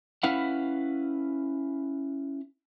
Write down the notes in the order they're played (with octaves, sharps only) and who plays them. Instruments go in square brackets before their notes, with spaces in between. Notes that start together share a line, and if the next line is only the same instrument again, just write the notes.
[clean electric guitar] C#4 E4 B4 F5 F#5